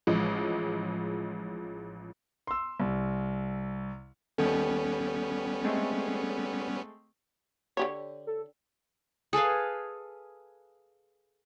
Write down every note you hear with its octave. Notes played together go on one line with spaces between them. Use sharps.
A1 F3 G#3
C6 E6
C2
D#2 G3 B3 C#4 A4
G#3 A3 C4
D3 G4 C#5
A4
G#4 A4 B4 F5